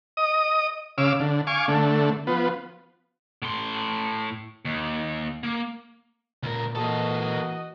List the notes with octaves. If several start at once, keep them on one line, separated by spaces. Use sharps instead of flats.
D#5 D#6
C#3 F5 D6 E6
D3
F5 G#5 C#6 D6
D3 A3
F3 B3
A2 C6
D#2
A#3
C#2 A#2 A#4
E3 A#3 F#4 A4 D#5